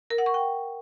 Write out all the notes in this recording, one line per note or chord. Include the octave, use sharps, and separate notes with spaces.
A#4
F#5
C#6
G5